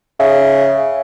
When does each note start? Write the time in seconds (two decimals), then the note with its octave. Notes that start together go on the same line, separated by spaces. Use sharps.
0.20 C#3 E5